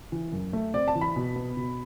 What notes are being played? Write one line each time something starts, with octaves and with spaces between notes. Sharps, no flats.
E3
F#2
A3
C4 D5
A5
E3
B5
B2
B3
B2